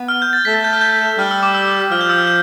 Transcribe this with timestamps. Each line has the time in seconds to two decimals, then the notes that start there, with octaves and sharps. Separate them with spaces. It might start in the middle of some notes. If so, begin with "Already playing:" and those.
Already playing: B3
0.09 F6
0.22 G6
0.33 A6
0.45 A3 B6
0.54 A6
0.64 G6
0.73 F6
0.81 G6
1.18 G3 F6
1.31 E6
1.43 D6
1.55 E6
1.91 F3 F6
2.01 G6
2.10 E6
2.18 F6
2.27 G6